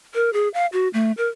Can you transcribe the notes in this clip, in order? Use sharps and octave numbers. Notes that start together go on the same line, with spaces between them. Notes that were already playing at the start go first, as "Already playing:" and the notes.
A#4
G#4
F5
F#4
A3
A#4